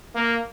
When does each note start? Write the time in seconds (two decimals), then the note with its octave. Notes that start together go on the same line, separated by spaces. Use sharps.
0.16 A#3